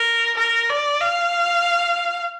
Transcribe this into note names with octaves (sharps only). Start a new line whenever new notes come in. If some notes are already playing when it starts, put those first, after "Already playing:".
Already playing: A#4
A#4
D5
F5